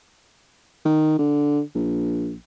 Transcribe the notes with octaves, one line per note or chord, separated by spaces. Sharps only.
D#3
D3
A#1